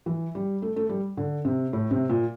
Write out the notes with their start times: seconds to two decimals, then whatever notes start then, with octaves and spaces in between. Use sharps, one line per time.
0.06 E3
0.35 G3
0.62 A3
0.76 A3
0.89 G3
1.17 D3
1.45 C3
1.73 A2
1.91 C3
2.10 A#2